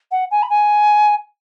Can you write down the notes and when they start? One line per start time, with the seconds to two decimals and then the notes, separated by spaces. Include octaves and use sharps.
0.11 F#5
0.31 G#5
0.42 B5
0.50 G#5